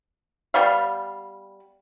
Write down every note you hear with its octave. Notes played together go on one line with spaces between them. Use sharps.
G3 B3 F5